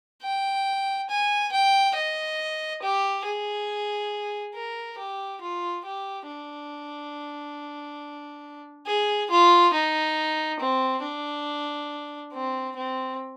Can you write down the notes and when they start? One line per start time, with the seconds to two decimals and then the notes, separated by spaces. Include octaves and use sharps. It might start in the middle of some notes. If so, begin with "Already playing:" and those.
0.23 G5
1.09 G#5
1.52 G5
1.95 D#5
2.82 G4
3.25 G#4
4.55 A#4
4.98 G4
5.41 F4
5.85 G4
6.27 D4
8.86 G#4
9.30 F4
9.74 D#4
10.60 C4
11.03 D4
12.33 C4
12.77 C4